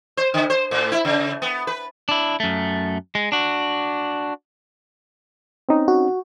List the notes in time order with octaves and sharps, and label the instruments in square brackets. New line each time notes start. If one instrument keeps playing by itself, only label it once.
[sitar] C5
D3
C5
A2
E4
C#3
B3
B4
[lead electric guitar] D4 E4
F#2 A3
G#3
D4 F#4
[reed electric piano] C4 C#4 D#4
[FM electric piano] F#4